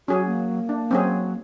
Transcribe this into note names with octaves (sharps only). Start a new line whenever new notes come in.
F#3 C#4 F#4 G#4
A#3
D4
F#3 C4 C#4 G#4